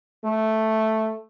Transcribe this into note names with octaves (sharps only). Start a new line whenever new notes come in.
A3